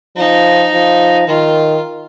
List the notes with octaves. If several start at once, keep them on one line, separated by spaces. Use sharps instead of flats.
F3 D#4
F3
D#3 F4